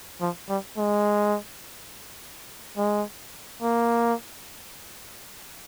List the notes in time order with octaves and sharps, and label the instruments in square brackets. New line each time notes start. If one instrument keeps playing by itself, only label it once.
[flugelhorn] F3
G3
G#3
G#3
A#3